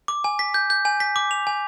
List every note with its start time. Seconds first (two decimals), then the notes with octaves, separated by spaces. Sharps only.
0.08 D6
0.24 G#5
0.39 B6
0.54 G6
0.70 G6
0.85 G#5
1.00 B6
1.16 D6
1.31 F7
1.47 G#5